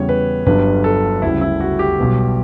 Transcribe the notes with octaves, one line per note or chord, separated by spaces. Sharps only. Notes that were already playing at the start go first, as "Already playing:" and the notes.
Already playing: E2 C#3 G3 C#5
B4
G1 G2 D3 F#3 B4
A4
D2 C#3 G3 E4
E4
F#4
G4
B1 B2 G3 B3